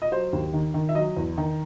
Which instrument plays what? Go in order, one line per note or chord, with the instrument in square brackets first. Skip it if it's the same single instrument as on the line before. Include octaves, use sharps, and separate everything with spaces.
[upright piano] D#5
[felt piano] F#3 [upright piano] C5
[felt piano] D#2
D#3
D#3
[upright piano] E5
[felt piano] F#3 [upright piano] D#5
[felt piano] E2
D#3